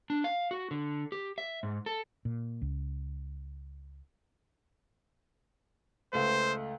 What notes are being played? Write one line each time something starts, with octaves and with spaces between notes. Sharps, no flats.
D4
F5
F#4
D3
G4
E5
G#2
A4
A#2
C#2
C#2 A3 C5